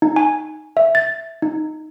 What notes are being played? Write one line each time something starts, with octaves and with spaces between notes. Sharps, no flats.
D#4
G#5
E5
A6
D#4